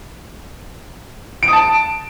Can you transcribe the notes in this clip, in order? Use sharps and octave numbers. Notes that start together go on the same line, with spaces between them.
D7
D#6
A5